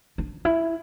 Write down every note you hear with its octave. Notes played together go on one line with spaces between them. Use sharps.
D4
E4